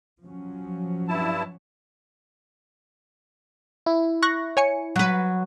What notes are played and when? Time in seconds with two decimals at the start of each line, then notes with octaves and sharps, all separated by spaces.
0.24 F3 F#3 C#4
1.08 G2 E4 A5
3.86 E4
4.22 C#6 F#6 A#6
4.57 C#5 G#5 C#7
4.96 F#3 B4